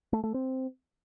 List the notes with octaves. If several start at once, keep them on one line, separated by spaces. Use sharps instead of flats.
A3
A3
C4